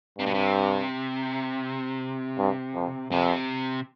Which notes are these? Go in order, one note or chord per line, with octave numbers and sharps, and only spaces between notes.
G2 C3
B2
C3
G2
F2
F2 C3